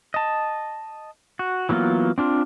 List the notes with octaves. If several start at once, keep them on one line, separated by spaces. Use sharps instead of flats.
D#5 A5
F#4
E3 F#3 A#3 B3 F4
C4 D4 F4